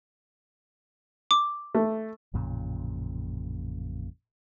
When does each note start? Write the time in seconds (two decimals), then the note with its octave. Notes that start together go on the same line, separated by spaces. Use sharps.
1.31 D6
1.75 A3
2.34 A1 F2 A#2 C#3